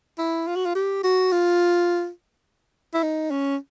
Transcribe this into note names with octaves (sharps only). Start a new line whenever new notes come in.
E4
F4
F#4
F4
G4
F#4
F4
E4
D#4
C#4